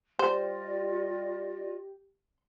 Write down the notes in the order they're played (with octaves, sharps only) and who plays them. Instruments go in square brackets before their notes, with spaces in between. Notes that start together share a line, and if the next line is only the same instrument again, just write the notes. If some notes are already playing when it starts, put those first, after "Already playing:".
[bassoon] G3 [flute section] F4 D5 D#5 [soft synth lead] G4 [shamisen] C5